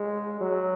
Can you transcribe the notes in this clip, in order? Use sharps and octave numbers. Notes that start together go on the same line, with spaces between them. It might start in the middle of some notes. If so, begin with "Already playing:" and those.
Already playing: G#3
F#3